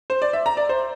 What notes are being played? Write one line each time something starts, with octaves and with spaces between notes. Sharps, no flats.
C5
D5
E5
A#5
D5
C5